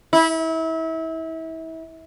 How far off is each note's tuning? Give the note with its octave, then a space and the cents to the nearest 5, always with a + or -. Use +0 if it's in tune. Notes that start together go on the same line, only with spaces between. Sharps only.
E4 -30